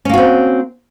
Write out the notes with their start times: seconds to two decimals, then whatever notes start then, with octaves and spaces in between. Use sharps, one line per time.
0.05 C#4
0.09 A#3
0.14 F#4
0.18 C4